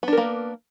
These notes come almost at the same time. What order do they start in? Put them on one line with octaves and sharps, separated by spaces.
B3 D4 A#4 A#3